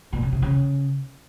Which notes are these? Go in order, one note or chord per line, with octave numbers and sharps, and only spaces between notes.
A#2
C#3
C3
C#3